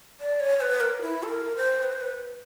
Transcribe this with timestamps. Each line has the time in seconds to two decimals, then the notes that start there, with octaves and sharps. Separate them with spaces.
0.20 D5
0.40 C#5
0.61 B4
0.80 A#4
1.02 E4
1.23 A4
1.28 A#4
1.56 C5
1.83 B4
1.92 C5
2.01 B4